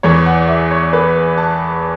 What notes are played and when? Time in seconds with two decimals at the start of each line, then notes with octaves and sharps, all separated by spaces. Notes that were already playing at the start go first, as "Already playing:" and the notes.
0.03 E2 E3 C#5
0.26 F#5
0.48 E5
0.71 C#5
0.93 B4
1.38 A5